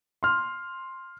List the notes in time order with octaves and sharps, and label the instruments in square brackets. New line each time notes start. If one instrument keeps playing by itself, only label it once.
[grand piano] C6 F6